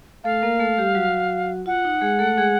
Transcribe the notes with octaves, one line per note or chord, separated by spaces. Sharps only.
A3 A4 F5
A#3 A#4
A3 A4
G3 G4
F#3 F#4
F4 F#5
D#4
G#3 G#4
A3 A4
G#3 G#4